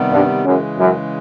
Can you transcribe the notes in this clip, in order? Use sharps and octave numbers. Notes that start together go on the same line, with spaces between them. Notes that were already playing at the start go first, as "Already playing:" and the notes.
Already playing: C3 D#3 G3 B3
G2
F#2 C#3 E3 G#3
F#2